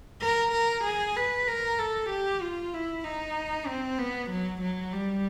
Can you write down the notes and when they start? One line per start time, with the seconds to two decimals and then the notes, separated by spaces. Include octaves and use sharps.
0.22 A#4
0.52 A#4
0.85 G#4
1.16 B4
1.47 A#4
1.78 A4
2.10 G4
2.41 F4
2.73 E4
3.04 D#4
3.67 C4
3.99 B3
4.30 F#3
4.62 F#3
4.93 G3